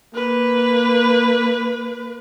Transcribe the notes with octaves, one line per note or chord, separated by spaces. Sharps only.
A#3 B4